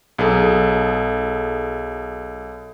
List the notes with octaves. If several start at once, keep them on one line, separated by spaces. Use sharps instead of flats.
B1 G#4 A4